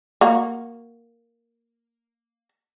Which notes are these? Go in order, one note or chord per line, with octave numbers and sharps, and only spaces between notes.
A#3 F#4